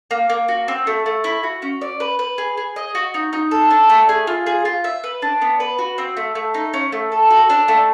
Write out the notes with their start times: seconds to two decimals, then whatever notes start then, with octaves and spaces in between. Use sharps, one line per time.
0.11 A#3
0.30 A#3
0.48 F#4
0.68 C4
0.87 A3
1.06 A3
1.24 E4
1.43 F#4
1.62 C#4
1.81 D5
2.00 B4
2.19 B4
2.38 G#4
2.57 G#4
2.76 D#5
2.95 F#4
3.14 D#4
3.33 D#4
3.51 A4
3.71 D4
3.90 A3
4.09 G#4
4.27 F4
4.46 G#4
4.65 F4
4.84 E5
5.04 B4
5.22 D4
5.42 B3
5.60 B4
5.79 F#4
5.98 C4
6.17 A3
6.35 A3
6.54 D#4
6.74 C#4
6.92 A3
7.12 A4
7.30 F#4
7.50 D4
7.68 A3